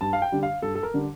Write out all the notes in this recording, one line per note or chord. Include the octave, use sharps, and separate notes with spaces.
G2 A5
F5
G5
D3 G3 D4
F5
G2 A4
A4
A#4
D3 G3 D4